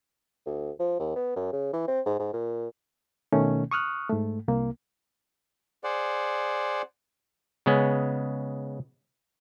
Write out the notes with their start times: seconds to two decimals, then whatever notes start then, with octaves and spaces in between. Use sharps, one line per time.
0.46 D2
0.79 F3
0.99 D#2
1.15 B3
1.36 F#2
1.52 C#3
1.73 E3
1.88 C4
2.06 G#2
2.19 G#2
2.33 A#2
3.32 B2 D#3 A3 C#4
3.71 C#6 D#6 F6 F#6
4.10 G#2 A3
4.48 C2 A#3
5.84 G#4 C5 D5 F#5
7.66 C#3 G#3 B3 C#4